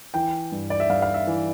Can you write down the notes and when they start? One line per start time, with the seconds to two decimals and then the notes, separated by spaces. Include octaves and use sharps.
0.14 E3 G5
0.52 G2
0.70 D5
0.80 E5
0.89 G2 F5
1.02 F5
1.14 E5
1.27 E3